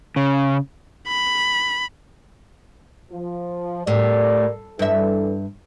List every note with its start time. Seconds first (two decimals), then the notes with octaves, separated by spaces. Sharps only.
0.16 C#3
1.08 B5
3.12 F3
3.87 A2 G4 A#4 D5
4.79 G2 E3 D4 A4 E5